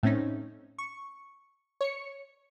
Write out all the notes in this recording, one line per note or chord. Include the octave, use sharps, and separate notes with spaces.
A2 A3 C4 C#4 D#4
C#6
C#5 C#7